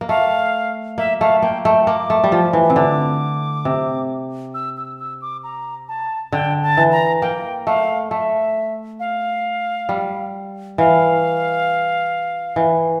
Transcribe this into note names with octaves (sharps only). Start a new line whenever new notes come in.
A#3
A3 F5
A#3 E5
A3 F5
A#3 G5
A3 G5
A#3 D6
A3
G3
F3
E3
C3
D3 D6
C3
E6
E6
E6
D6
A#5
A5
D3 G5
A5
E3
A#5
A#3 G5
A3 F5
A3 E5
F5
G3
E3 F5
E3